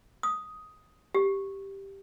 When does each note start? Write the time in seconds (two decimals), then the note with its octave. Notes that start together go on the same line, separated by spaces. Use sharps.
0.23 D#6
1.15 G4